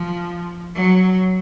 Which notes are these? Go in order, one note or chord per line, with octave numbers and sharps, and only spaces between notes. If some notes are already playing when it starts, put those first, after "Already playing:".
Already playing: F3
F#3